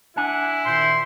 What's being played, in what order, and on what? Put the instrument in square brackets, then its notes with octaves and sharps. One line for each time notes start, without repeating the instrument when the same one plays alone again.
[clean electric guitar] D4 G#5 [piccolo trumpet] E4 [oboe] F#5
[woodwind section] A#2 D#3 C6 [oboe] C5